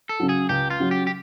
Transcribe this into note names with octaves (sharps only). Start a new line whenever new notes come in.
A4
C#3 F#3
G#4
C#2 G4
F4
C#3 F#3
G4
G4